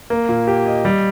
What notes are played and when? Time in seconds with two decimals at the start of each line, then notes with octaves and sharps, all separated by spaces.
0.10 A#3
0.29 A#2
0.48 G4
0.66 D#5
0.85 G3